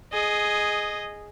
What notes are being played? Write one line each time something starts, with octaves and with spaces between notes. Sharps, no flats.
G#4 D#5